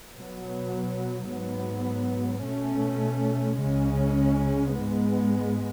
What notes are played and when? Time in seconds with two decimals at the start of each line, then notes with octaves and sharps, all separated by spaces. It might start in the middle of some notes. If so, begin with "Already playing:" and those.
0.13 B2 F#3 B3
1.28 G#2 F#3 B3
2.44 B2 A3 C#4
3.59 C#2 C#3 G#3 C#4
4.75 G#2 G#3 B3